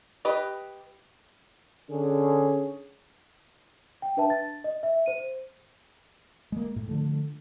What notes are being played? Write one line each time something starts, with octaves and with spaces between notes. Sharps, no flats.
G4 B4 D#5
D3 C#4 G#4
G5
D4 B4 E5 A5
A6
D#5
E5
C5 D#7
G#3 A#3
A2
D3 F3 A3